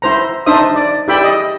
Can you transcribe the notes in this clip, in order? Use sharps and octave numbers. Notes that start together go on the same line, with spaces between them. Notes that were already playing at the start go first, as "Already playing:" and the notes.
E4 C5 A#5
D4 D#4 C5 E5 D#6
D5
E4 G4 D5 E5 G5 B5
D#5